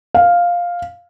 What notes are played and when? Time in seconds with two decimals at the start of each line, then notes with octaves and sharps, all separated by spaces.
0.14 F5